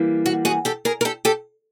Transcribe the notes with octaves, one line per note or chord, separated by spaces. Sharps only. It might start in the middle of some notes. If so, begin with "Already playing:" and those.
Already playing: E3 G3 A#3
F#4
F#4 G#4
G4 A4
G#4 A#4
A#4
G4 A4
G4 A4